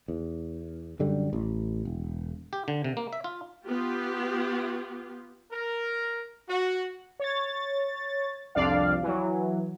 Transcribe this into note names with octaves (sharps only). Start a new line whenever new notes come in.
E2
F#2 D3 G3
A1
E1
G4
D3
C3
A#3
E5
F4
B3 F4 G4
A#4
F#4
C#5 A6
C2 F2 D4 D5 F5
E3 F#3